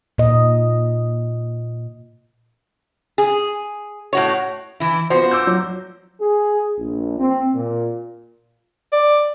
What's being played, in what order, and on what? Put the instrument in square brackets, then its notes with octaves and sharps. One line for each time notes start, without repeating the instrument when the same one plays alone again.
[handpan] A#2 D#5
[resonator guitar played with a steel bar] G#4
A2 F#4 C#5
E3 E4
[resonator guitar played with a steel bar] F3 F#4 [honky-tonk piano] B3 C5
[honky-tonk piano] D6 E6 G6
F#3
[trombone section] G#4
A#1
C4
A#2
[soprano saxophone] D5